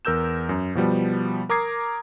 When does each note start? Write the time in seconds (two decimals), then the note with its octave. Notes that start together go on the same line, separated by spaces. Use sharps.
0.05 E2 A#4 E6 G6 E7
0.49 F#2
0.75 B2 F3 G3 B3
1.49 A#4 A#5 D6 D#6 G#6 C7